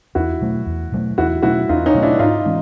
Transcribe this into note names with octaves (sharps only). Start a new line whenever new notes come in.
E2 E4 F#4
B2 F#3 A3
E2
B2 F#3 A3
E2 E4 F#4
B2 F#3 A3 E4 F#4
E2 D#4 F4
C#4 D#4
B2 F#3 A3
D4 E4
G#2 D#4 F4
E3 G#3 C#4